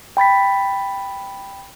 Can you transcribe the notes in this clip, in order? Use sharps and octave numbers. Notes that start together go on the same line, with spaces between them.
G5 B5 A6 B6